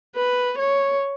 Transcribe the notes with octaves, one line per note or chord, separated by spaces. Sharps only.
B4
C#5